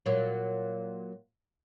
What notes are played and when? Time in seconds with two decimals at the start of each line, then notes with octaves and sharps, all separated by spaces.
0.06 A#2 F#3